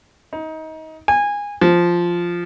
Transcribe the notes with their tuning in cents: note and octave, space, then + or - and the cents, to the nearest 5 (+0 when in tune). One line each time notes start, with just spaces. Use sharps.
D#4 +25
G#5 -20
F3 -5